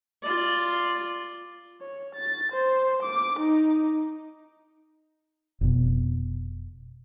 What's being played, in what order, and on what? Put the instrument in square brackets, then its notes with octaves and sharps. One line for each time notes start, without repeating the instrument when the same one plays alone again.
[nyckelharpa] F4 D5
[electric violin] C#5
A6
C5
D6
D#4
[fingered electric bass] F1 B2